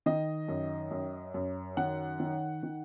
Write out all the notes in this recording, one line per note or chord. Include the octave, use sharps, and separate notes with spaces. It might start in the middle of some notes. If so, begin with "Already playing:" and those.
D#3 D#5
F#2
F#2
F#2
D#3 F#5
D#3
D#3